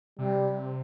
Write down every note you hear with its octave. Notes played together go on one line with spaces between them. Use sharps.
C3 G3